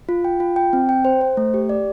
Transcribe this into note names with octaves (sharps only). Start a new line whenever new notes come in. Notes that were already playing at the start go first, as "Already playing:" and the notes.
F4
G5
F4
G5
C4
G5
C5
C5
A3
G4
D5